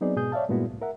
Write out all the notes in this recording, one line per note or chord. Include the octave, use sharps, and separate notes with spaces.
F#3 B3 C4 D#4 G#4 D5
G#2 B2 G#4 D#6 G6
C#5 D5 E5 F5 A5
G2 A#2 G#3 B3 E4 F#4
C2 A2
A#4 E5 F#5